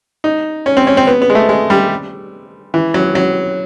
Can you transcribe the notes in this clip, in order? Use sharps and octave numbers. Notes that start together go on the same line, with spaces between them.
D#4
C#4
C4
C#4
C4
B3
B3
G#3
A3
G#3
G3
E3
F#3
F#3